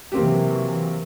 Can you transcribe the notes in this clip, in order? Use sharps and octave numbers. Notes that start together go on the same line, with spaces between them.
C3 E3 F#3 A#3 C4 G4